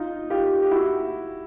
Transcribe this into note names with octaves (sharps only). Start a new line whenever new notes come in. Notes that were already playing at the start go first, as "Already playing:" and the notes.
Already playing: D#4 F4
F4 G4
G4
E4 F#4